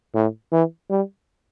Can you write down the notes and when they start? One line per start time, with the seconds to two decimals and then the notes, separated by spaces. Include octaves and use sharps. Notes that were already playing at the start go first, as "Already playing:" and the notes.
0.15 A2
0.52 E3
0.90 G3